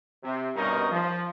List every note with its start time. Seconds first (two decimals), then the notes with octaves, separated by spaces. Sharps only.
0.23 C3
0.56 C2 G2 B2 C#4 D#4 A#4
0.91 F3